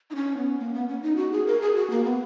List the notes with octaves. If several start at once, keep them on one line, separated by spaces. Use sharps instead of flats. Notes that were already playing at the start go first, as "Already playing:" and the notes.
D#4
C#4
B3
A#3
B3
C#4
D#4
F#4
G#4
A#4
G#4
F#4
A#3
B3